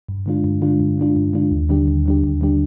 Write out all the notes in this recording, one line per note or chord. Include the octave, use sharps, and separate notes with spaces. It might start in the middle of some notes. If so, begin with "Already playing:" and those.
G2
D3 G#3 D4 F4
G2
D3 G#3 D4 F4
G2
D3 G#3 D4 F4
G2
D3 G#3 D4 F4
D#2
D3 G3 D4 G4
D#2
D3 G3 D4 G4
D#2
D3 G3 D4 G4